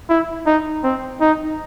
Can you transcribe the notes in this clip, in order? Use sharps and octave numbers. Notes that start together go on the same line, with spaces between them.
E4
D#4
C4
D#4